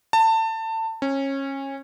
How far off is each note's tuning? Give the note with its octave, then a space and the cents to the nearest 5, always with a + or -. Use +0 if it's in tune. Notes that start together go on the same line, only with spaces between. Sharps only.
A5 +25
C#4 -25